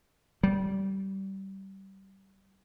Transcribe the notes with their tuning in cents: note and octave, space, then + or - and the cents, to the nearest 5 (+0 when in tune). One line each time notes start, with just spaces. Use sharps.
G3 -20